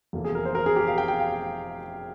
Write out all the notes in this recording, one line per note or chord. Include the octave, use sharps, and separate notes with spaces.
F1 E2 E3 A#3
G#4
A#4
C5
A#4
G#4
G4
F5
G5
G5
F5